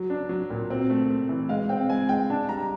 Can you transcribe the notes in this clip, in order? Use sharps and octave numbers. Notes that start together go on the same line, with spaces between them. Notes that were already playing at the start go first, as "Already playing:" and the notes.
Already playing: F#3
D4
F#3
A#2
C4
A3
A3
E3
G#3 F5
C4 G5
G#3 G#5
G#3 G5
D4 A5
G3 A#5